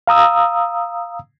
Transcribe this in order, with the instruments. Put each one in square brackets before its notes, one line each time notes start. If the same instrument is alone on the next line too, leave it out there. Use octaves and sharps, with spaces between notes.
[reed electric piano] F5 A#5 D#6 E6